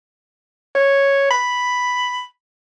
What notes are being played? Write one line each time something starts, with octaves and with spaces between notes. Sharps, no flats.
C#5
B5